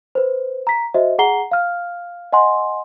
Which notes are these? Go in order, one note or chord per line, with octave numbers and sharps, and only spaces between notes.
B4 C5
A#5 B6
F#4 C5 D#5 E5
G#4 F#5 A#5 C7 G7
F5 F6
D#5 F#5 G#5 C6